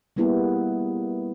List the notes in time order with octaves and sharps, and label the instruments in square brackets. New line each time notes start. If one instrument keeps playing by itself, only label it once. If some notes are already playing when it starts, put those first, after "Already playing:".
[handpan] G3 A#3 B3 E4 G#4